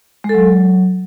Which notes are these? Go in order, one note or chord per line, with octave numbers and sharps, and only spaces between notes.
G#3
A4
F#3